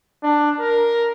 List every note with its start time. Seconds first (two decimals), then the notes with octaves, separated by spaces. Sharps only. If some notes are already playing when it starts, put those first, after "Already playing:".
0.23 D4
0.60 A#4